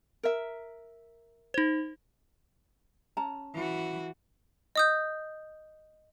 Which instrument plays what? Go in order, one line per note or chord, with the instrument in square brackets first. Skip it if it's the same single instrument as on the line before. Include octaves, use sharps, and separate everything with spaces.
[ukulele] A#4 E5
[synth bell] D#4 C5
[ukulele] C#4 A5 A#5
[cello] E3 F#4
[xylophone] D#5 D#6 G6